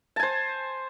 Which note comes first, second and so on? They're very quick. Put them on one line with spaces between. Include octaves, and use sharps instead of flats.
A5 G#5 C5